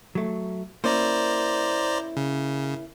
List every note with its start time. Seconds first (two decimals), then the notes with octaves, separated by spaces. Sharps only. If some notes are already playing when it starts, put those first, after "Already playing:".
0.15 F#3 A3
0.84 A#3 C#4 E4 C5 D5 A#5
2.17 C#3